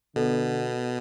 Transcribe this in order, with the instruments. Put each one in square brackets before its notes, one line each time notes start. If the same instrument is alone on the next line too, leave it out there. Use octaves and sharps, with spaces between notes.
[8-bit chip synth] B2 [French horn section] D3 B3 [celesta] A4